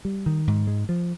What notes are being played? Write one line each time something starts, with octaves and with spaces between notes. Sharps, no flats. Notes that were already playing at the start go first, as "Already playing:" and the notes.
G3
D#3
G#2
G#3
F3